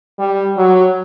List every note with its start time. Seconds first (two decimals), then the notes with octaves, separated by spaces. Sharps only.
0.19 G3
0.57 F#3